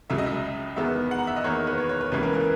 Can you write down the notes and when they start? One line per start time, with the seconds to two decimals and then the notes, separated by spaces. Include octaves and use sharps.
0.10 C#2 C#3 F#3 E5
0.18 D#5
0.26 E5
0.76 E2 D#3 G#3 B3 E5
1.11 F#5
1.18 A#5
1.27 E5
1.36 D#5
1.44 E2 D#3 A#3 C#5
1.67 B4
1.78 C#5
1.89 C#5
2.01 B4
2.11 C#2 C#3 E3 A#3 C#4 B4
2.23 A#4
2.34 A#4
2.40 B4